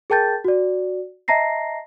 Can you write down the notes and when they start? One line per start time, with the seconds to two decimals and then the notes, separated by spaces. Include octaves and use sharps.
0.10 G#4 A#4 G5 A5 G6 A6
0.44 F#4 D5
1.28 D#5 E5 A5 A#5 A#6 C7